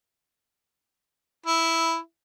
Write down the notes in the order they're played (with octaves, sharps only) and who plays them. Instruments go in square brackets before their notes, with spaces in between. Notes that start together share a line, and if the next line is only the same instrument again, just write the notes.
[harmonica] E4